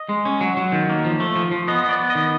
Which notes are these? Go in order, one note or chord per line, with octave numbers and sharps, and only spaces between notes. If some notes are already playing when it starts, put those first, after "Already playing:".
Already playing: D#5
G#3
C#4
F#3
F#3
D#3
A#3
F3
A3
F3
F3
B3 D#5
B3
D5
B3
D#5
D#3